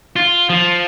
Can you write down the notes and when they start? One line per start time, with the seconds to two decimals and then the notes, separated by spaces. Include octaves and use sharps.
0.16 F4
0.50 F3